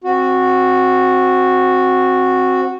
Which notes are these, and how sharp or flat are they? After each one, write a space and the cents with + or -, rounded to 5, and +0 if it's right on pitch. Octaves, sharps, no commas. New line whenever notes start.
C4 +10 F#4 -10